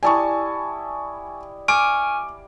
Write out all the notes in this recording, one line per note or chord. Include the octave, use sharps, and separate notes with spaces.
G3 E4 D#5 G#5 A5 C#6
G#5 C#6 D6 F6 D7